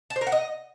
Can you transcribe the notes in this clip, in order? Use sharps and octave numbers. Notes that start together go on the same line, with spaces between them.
A5
C5
A#4
F#5
D#5